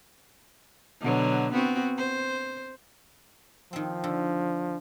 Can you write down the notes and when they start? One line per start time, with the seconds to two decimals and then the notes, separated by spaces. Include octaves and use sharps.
1.01 B2 D3 F#3
1.53 B3 C4 F#4
1.98 C5
3.73 D#3 F3 C4
4.04 D3